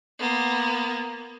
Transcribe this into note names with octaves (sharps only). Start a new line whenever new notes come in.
A#3 B3